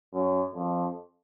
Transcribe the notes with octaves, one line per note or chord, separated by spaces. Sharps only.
F#2
F2